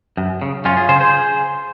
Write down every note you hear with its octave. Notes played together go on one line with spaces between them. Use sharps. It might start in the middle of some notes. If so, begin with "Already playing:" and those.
F#2
C#3
F#2 C#4 F4
F4 G#4
C#3 G#4 C5
G#4 C5